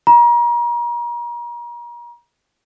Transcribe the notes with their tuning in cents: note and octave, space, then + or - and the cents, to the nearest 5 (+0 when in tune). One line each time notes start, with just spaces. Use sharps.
A#5 +35